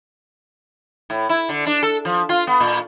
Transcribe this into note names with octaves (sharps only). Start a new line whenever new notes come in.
A2
E4
D3
D4
A4
F3
F4
B3
A#2